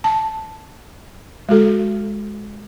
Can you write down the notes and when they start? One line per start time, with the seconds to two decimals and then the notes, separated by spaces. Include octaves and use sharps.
0.04 A5
1.49 G#3 F#4 A4